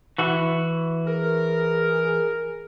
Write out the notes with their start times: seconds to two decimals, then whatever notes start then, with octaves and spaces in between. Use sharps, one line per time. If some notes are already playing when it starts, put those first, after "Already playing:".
0.18 E3 F#4
1.07 G#4 A#4